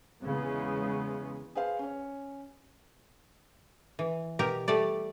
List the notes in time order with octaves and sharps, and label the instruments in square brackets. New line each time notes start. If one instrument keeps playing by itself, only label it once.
[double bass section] E2 C#3 G#3 B3
[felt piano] G#4 B4 C5 F5
C#4 C#5
[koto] E3
B2 G4 A#4
G3 A3 D5